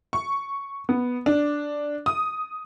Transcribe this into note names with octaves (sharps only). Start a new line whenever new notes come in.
C#6
B3
D4
D#6